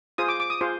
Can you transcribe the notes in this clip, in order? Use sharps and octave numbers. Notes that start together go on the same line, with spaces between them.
F4 G#4 C5 D#6
D6
D6
D#6
F4 G#4 C5